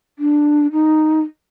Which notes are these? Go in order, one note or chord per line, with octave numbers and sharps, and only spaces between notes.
D4
D#4